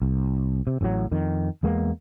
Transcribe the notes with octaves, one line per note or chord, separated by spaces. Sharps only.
C2
C3
A1 A2 E3 F#3
F2 D#3
E2 G#3 A#3 B3